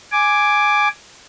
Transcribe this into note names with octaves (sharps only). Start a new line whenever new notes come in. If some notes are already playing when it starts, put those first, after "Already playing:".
G#5 D6